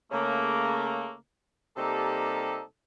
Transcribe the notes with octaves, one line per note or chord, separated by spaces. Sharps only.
C#3 A3 A#3
C3 G3 A#3 D#4 G4 A4